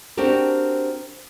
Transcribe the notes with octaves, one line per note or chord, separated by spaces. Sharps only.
C4 D4 F#4 G4 A#4